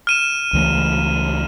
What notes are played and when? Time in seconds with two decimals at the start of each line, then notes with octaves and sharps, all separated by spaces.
0.07 F6 D#7 E7
0.53 C#2 E3 A3